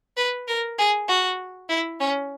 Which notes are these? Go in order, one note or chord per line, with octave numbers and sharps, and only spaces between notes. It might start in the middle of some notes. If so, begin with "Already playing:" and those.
B4
A#4
G#4
F#4
E4
C#4